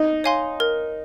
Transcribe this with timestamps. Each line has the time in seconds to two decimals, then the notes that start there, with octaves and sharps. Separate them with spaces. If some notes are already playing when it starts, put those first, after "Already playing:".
Already playing: D#4
0.24 C#5 F5 G#5 C6
0.60 A#4